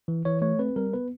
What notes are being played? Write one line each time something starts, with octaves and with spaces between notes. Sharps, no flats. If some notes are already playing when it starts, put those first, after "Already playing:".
E3
E3 C#5
A3 C#5
C4 B4
G3 A#4
B3 B4